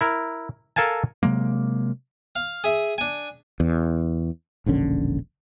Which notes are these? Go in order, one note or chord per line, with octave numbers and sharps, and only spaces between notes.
E4 A#4
A4 A#4 F5 G#5 A5
C3 F#3 G#3 A#3
F5
G#4 E5
D4 G#5
E2
E1 A#1 D3 C#4